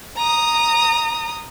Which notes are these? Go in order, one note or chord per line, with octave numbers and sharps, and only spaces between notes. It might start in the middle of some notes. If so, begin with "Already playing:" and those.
A#5 D#6